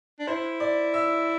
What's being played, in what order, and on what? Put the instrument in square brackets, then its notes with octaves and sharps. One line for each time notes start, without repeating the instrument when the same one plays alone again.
[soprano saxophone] D4
[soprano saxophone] E4 [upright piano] C5
[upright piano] D5
E5